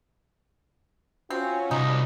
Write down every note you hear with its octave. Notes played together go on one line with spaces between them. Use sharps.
C4 C#4 F4 F#4
C2 D#4